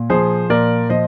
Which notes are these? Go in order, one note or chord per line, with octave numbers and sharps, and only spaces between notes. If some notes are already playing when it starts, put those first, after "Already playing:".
Already playing: A#2
F3 G#4 C5
A#2 A#4 D5
F3 C5 D#5